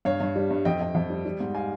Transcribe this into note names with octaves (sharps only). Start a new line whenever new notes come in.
G2 C#5 F5
G2
G3
G2
F2 D#5 G5
F2
F2
G3
G3
G#2
F5 G#5